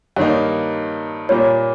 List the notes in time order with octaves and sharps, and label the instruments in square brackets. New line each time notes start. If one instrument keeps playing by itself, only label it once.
[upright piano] G2 D#3 A#3 D#4 [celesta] C#5
[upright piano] A#2 G3 A#3 F4 [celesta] C#5